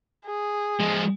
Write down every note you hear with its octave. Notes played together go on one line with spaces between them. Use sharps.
G#4
F3 G#3